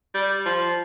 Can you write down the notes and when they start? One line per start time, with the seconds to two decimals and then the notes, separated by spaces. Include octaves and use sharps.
0.14 G3
0.45 F3